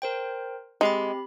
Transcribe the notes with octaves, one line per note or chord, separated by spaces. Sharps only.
A#4 C5 G5
G#3 C4 G4 B5